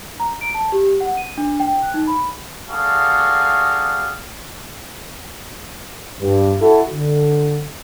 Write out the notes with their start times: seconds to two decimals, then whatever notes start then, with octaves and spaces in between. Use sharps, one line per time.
0.20 A#5
0.41 D7
0.54 A5
0.72 G4
1.01 F#5
1.17 D#7
1.38 D4
1.60 G5
1.82 F#6
1.94 D#4
2.07 B5
2.69 G3 F#4 G#4 A4 F5
6.20 G2
6.61 E4 F#4 A4
6.92 D3